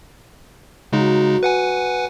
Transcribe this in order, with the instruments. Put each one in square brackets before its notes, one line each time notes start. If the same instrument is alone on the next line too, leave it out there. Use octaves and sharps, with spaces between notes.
[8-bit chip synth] C#3 G#3 D#4 [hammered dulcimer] F#3
[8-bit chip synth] B4 F#5 G#5